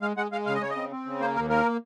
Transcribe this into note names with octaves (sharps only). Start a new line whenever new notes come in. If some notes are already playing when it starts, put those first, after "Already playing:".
G#3 F5
G#3 F#5
G#3 F5
C#3 F5
D#5
C#3 C#5
D#5
C4
C4
C#3
A#3 C5
D#2 A#4
A#3 A#4